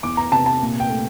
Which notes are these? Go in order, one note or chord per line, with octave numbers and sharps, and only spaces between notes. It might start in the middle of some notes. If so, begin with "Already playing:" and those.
E2 D6
A#5
C3 A5
A5
A#2
G5
A3